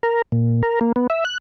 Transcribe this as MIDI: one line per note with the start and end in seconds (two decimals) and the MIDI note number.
0.03 0.22 70
0.32 0.62 46
0.63 0.79 70
0.81 0.92 58
0.96 1.07 59
1.10 1.24 76
1.25 1.38 90